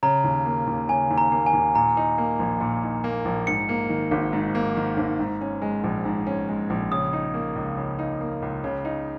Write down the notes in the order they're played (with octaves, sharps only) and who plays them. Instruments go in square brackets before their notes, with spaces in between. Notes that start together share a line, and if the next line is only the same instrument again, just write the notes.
[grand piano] C#3 [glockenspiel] A#5
[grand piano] D#2
A#3
D#2
[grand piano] C#3 [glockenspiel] G#5
[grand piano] D#2
[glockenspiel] A#5
[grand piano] A#3
[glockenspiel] G#5
[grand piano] D#2
[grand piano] A#2 [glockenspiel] A#5
[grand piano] D#4
A#3
A#1
A#2
D#4
A#3
A#1
[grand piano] G#2 [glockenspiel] C#7
[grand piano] A#3
D#3
G#1
G#2
A#3
D#3
G#1
G#2
C#4
G#3
A#1
G#2
C#4
G#3
A#1
[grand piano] C#3 [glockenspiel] D#6
[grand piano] D#4
A#3
C#2
C#3
D#4
A#3
C#2
C#3
D#4